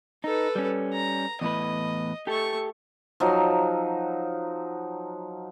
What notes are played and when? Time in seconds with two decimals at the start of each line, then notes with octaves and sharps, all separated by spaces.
0.24 D#4 A4 B4
0.55 G3 C#4
0.93 A#5
1.41 E2 A2 B4 D#5
2.27 A3 G4 A4 C#6
3.20 F3 F#3 D#4